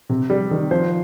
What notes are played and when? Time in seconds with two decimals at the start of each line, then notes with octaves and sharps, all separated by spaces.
0.09 C3
0.30 G3
0.51 D#3
0.71 F3 C5